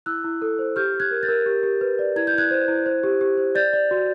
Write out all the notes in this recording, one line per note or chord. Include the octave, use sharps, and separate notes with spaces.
E4 E6 F#6
E4
A4
C5
G4 F6 G6
G4
F#6 G#6
A#4
G6 A6
A#4
G4
G4
B4
D5
E4 G#6
G6
E4 F#6 G#6
C5
E4
C5
G4
G4
C5
D5 G6 A6
D5
F#4